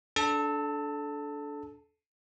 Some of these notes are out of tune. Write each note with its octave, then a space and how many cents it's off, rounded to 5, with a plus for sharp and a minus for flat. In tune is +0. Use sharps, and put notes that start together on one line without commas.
D4 -15 A4 -20 A5 +20